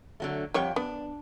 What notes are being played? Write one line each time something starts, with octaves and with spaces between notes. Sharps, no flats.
D3 F#3 A3
F2 F3 G3 C#5 F#5 G5
B3 D4